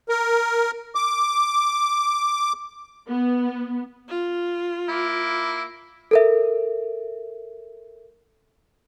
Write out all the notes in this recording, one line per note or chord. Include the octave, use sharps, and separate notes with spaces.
A#4
D6
B3
F4
A#3 E4
A4 A#4 E5